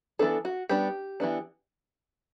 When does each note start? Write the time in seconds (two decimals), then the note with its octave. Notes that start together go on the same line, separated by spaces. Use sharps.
0.19 E3 B3 D4 A4
0.45 F#4
0.69 G3 B3 D4 G4
1.20 E3 B3 D4